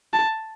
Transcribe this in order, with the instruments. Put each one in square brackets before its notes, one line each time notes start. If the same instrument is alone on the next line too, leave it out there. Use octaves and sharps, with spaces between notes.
[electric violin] A5